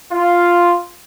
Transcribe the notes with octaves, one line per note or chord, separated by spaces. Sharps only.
F4